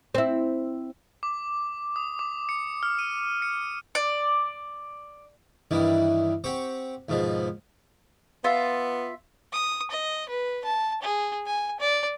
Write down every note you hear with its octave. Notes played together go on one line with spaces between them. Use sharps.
C4 E4
D6
D#6
D6
C#7
F6
D#7
C#7
D5
G2 D#3 E3 G3
C4 G4 F#5 C#6
D#2 G#2 B2 F3
B3 F4 E5
D#6
D#5
B4
A5
G#4
G#5
D5